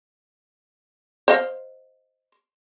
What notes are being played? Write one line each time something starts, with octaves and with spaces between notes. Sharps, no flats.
C5 D#5 F5